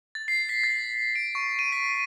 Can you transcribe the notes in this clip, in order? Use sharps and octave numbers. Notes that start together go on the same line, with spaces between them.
A6
C7
B6
A6
D7
C#6
D#7
B6